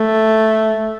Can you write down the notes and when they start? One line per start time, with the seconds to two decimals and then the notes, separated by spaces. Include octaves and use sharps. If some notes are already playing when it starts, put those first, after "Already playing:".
Already playing: A3